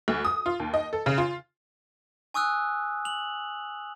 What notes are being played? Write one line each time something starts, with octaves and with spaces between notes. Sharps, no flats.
D2
D#6
F4
D#2
D#5
A4
C#3
F4
G#5 C#6 D#6 E6 F#6
F7 F#7